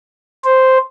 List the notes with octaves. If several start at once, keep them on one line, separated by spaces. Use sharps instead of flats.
C5